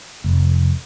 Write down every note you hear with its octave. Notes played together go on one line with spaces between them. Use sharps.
F1